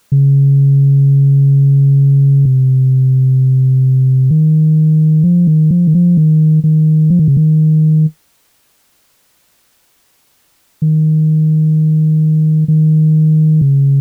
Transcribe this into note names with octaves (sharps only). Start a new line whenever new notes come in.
C#3
C3
D#3
F3
D#3
F3
D#3
F3
D#3
D#3
F3
D#3
C#3
D#3
D#3
D#3
C#3